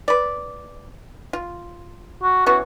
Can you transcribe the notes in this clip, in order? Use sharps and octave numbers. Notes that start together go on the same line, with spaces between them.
B4 D5
F4
F#4
E3 B3 C#4 F#4